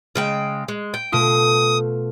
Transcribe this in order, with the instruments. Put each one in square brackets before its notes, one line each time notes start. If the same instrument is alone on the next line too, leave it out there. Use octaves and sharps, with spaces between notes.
[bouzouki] C#3 G#3 G5
G#3
G5
[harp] B2 A3 F4 [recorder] D#6